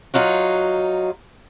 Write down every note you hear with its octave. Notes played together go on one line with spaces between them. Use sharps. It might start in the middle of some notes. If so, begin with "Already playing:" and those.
F#3 D#4 F4 F#4